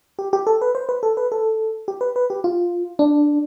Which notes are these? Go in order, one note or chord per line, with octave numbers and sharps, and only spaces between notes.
G4
G4
A4
B4
C5
B4
A4
B4
A4
G4
B4
B4
G4
F4
D4